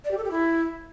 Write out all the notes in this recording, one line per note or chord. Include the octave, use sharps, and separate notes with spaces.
D5
G4
A4
G4
E4